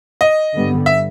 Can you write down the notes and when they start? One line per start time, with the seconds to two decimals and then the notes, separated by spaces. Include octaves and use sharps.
0.21 D#5
0.53 G2 D3 G3 B3
0.86 E5